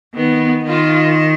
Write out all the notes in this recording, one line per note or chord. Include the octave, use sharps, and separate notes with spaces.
D#3 B3
D#3 F4